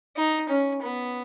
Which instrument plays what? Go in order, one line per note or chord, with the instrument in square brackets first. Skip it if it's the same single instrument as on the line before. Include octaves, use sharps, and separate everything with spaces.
[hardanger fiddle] D#4
C#4
B3